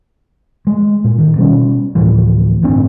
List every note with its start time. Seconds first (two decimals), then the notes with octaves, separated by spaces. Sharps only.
0.67 G#3
1.04 A#2
1.18 D#3
1.36 B2 G3 C#4
1.95 D2 A2 E3 F3
2.63 G1 A2 C4 D4